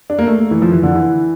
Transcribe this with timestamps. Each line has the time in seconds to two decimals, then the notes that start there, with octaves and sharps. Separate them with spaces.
0.10 D4
0.19 A#3
0.27 A3
0.51 E3
0.62 F3
0.72 E3
0.83 D3
0.95 E3